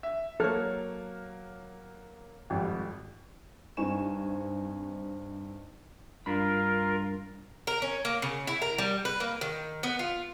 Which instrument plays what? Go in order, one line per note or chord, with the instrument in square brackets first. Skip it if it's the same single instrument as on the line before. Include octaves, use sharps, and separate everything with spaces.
[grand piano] E5
[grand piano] F#3 A#3 F6 [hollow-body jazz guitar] A4 C#5
[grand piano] G#1 F2 G3
[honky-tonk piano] G2 C4 D#4 G#5 C#6 E7
[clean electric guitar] G2 D4 B5 [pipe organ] F4 A#4
[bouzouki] A#4
C#4
A#3
C#3
E4
A#4
G3
B4
A#3
D#3
B3
F4